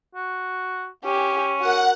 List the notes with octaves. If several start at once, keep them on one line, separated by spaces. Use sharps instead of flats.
F#4
C#4 G4 G#5
F#4 A#4 F#5